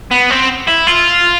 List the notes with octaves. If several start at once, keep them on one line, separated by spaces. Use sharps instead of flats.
B3
C4
E4
F4